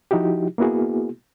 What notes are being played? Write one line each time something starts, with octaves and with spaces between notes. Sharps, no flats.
F3 D#4 E4 F#4 G4
A#3 B3 E4 F#4 G#4